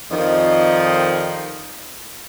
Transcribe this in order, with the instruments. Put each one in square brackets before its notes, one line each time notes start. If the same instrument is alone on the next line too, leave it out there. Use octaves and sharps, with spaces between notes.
[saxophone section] F2 D#3 F3 G3 D#4 D#5